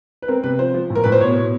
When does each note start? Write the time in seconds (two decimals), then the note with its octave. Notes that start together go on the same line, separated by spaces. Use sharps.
0.22 B4
0.28 C4 A#4
0.44 C3 B4
0.59 F3 C5
0.74 F3
0.90 A2
0.95 A#4
1.04 A2 B4
1.12 C5
1.21 B2 C#5
1.36 B2